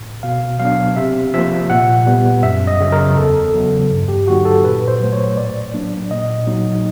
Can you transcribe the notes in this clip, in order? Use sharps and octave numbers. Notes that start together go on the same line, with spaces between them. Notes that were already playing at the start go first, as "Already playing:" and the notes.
Already playing: A2
B2 F5
F#3 B3 D4 F5
C3 E5
F3 A#3 E5
A#2 F#5
G3 B3
F#2 E5
D#5
C#3 F#3
A#4
E2 A4
C#3 F#3 B3
G2
G4
D3 F#3 A#3 D#4 F#4
A4
A#2 B4
C5
F#3 A3
C#5
A2 D5
F#3 A#3 D4
A#2 D#5
F#3 A#3 D#4